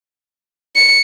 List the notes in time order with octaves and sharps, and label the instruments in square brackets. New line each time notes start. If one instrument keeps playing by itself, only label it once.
[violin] C#7